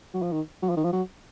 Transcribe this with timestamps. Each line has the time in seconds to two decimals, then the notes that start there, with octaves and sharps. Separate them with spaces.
0.14 F#3
0.22 F3
0.32 D#3
0.62 F#3
0.70 F3
0.77 D#3
0.84 F3
0.93 F#3